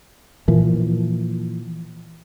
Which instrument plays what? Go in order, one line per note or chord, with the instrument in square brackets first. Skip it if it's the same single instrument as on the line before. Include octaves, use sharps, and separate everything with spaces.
[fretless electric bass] A#2 E3 F3 A#3